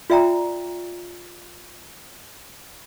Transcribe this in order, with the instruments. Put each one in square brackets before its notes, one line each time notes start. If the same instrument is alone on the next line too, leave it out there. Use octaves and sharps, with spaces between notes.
[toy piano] F4 D5 E5 G5 A#5